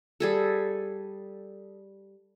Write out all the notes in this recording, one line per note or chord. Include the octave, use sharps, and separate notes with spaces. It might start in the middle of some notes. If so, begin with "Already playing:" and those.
G3 G#4 A4